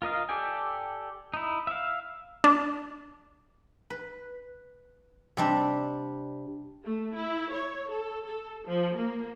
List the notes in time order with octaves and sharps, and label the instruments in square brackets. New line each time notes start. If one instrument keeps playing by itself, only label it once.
[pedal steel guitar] F4 A#4 D#5 F5
G4 A4 D5 G5 G#5
D#4 E4
E5 F5
[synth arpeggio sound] D4
[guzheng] B4
C3 G3 D4
[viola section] A3
E4
C#5
A4
A4
F3
A#3